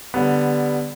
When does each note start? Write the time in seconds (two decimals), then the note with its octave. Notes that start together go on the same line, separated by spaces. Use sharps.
0.14 D3 G3 B3